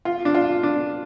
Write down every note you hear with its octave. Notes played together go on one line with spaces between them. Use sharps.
F4
D4
F4
D4